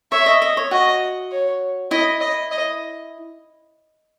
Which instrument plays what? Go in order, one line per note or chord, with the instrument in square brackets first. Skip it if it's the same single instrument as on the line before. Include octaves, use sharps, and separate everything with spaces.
[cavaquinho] C#5 [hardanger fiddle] E5
[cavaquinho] D#5
D#5
C#5
[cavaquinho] F#4 [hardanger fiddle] D#5
[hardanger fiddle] C#5
[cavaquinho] E4 [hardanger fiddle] D#5
[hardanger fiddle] D#5
D#5